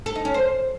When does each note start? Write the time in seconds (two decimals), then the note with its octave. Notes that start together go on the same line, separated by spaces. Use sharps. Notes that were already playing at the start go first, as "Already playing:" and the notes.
0.06 A4
0.15 D#4
0.25 C#4
0.34 C5